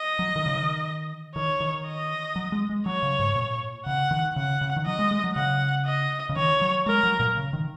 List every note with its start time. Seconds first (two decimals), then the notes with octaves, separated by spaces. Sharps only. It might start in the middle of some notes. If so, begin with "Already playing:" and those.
Already playing: D#5
0.19 F#3
0.36 D#3
0.46 C#3
0.56 D#3
1.35 D#3 C#5
1.61 D#3
1.86 D#5
2.36 F#3
2.52 G#3
2.69 G#3
2.86 F#3 C#5
3.03 C#3
3.19 G#2
3.36 A#2
3.86 C#3 F#5
4.11 D#3
4.36 C#3 F#5
4.61 C#3
4.76 D#3
4.86 F#3 D#5
4.99 G#3
5.11 G#3
5.24 F#3
5.36 C#3 F#5
5.86 D#5
6.29 C#3
6.36 D#3 C#5
6.61 F#3
6.86 G#3 A#4
7.03 F#3
7.20 A#2
7.36 C#3
7.53 D#3